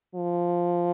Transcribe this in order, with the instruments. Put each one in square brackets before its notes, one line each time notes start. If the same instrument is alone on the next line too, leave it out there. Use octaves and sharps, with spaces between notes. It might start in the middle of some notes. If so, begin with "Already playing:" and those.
[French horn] F3